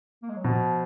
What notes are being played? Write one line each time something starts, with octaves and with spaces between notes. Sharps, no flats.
A#3
G#3
F#3
B2 F3